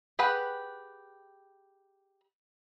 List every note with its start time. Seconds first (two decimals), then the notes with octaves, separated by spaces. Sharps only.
0.19 G4 G#4 B4 F#5